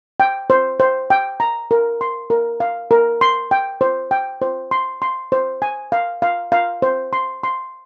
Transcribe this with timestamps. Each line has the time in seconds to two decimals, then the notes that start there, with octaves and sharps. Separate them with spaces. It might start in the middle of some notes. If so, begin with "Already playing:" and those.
0.20 G5
0.50 C5
0.80 C5
1.10 G5
1.40 A#5
1.71 A#4
2.01 C6
2.30 A#4
2.60 F5
2.91 A#4
3.21 C6
3.51 G5
3.81 C5
4.11 G5
4.42 C5
4.71 C6
5.02 C6
5.32 C5
5.62 G#5
5.92 F5
6.22 F5
6.52 F5
6.82 C5
7.13 C6
7.43 C6